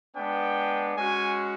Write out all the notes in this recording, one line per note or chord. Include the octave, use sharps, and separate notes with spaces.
G#3 B3 D4 G5
G#3 C#4 F#4 G#5